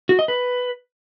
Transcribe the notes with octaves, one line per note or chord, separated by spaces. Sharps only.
F#4
D#5
B4